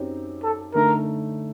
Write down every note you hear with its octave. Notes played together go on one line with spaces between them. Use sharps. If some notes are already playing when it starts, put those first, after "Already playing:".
Already playing: F#2 F#3 C4 D#4 G4
A4
D3 A3 D#4 A#4